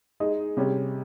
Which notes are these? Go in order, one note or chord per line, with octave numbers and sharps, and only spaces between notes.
G#3 D#4 G#4 D#5
C3 G3 C#4 G#4 C#5